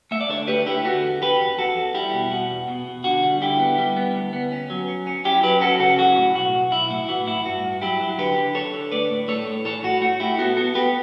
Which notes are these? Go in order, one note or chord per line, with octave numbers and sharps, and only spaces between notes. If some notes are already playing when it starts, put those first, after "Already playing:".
A3 E5
D5
D3 A4 C#5
A3 G4 B4
D3 E4 G4
D3 F#4 A4
E2
E2 G4 B4
E2
E2 F#4 A4
E2
G3 E4 G4
B2
B2 F#4
E2
B2
B2
D3 F#4
G3
D3 E4 G4
B3
G3
B3
D2
B3
C#4
F#3
C#4
C#4
C#4 E4 G4
F#3 G4 B4
C#4 F#4 A4
C#3 F#4 A4
E3 F#4
A2
B1 F#4
B1
B1 E4
A2 E4
E3 F#4
A2 E4
G2 F#4
G2
F#3 E4 G4
F#3
D3 G4 B4
D3
D3 A4 C#5
D3
A3 B4 D5
A2
A3 A4 C#5
A2
E3 A4 C#5
A2 F#4
A3 F#4
A2 E4 G4
B3 F#4 A4
B3 F#4 A4
B3 G4 B4